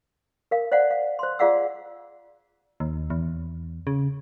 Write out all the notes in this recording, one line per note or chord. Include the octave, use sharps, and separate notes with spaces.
A#4 F5
C5 D5 F5 F#5
F5
C5 C6
F4 G#4 D5 F5 F#5 E6
D#2
E2
C#3